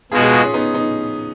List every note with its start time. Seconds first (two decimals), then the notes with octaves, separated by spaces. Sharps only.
0.12 B2 G#3 B3 F4 F#4 G#4
0.22 F4 G#4
0.33 F4 G#4
0.43 C#4 F4
0.54 B3 D#4
0.74 B3 D#4